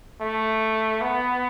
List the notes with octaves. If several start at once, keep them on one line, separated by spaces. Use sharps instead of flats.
A3
B3